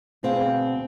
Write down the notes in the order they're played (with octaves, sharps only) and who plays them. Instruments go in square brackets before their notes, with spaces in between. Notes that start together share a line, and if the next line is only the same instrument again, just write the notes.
[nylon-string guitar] D2 B2 C4 G#4 C5 F5